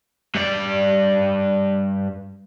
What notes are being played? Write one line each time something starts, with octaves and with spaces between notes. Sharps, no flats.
G2 D5